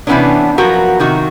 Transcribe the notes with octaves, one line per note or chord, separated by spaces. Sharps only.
C3 E3 F#3 B3 C#4 D4
F3 F#3 B3 F#4 A#4
C3 D#3 F#4